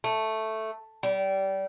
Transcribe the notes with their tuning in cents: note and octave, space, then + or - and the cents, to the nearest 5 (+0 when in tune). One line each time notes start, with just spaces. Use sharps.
A3 +0
G3 -25